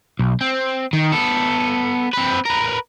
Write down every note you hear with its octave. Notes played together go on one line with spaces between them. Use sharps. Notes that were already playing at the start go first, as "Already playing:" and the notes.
B1
C4
D#3
B3 A4
C4 B4
A#4 B4